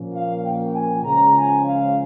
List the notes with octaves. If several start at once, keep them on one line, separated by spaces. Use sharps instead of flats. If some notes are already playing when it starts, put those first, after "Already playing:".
Already playing: A#2 F3 A#3 C#4
F5
G5
G#5
C#2 C#3 F3 G#3 C#4 A#5
G#5
F5